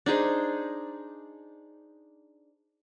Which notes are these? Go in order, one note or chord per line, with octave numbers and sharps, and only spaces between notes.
D4 D#4 G#4 C5